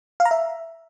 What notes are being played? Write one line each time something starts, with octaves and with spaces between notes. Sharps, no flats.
F5
A#5
E5